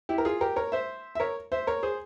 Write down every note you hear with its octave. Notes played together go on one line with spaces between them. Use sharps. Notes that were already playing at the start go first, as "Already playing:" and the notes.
E4 G4
A#4
F4 G#4
G4 A#4
A#4 C#5
C5 E5
E5
A#4 C#5
C5 E5
A#4 C#5
G#4 C5